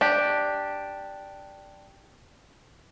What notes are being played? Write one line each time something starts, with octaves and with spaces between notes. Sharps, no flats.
D4 G4